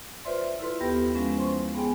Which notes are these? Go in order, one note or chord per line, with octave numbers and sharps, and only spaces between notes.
F4 B4 C5 D5 E5 C6
E4 F4 A4 B4 C6
D#2 B3 G4 B4 G5 A#6
F3 G#3 C#4
C5 C6 C#6
B3 G#4 G5 G#5